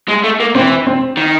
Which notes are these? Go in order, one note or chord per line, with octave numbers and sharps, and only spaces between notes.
G#3
A3
A#3
E3 C4
C4
D#3